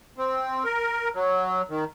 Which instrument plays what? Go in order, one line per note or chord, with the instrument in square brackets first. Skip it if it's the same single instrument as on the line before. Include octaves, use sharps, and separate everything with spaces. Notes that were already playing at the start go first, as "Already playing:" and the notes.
[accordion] C4
A#4
F#3
D#3